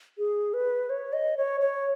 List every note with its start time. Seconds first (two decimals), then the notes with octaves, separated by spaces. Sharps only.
0.18 G#4
0.54 B4
0.90 C#5
1.13 D#5
1.37 C#5
1.61 C#5